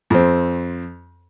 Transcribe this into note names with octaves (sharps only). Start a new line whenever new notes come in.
F2 C4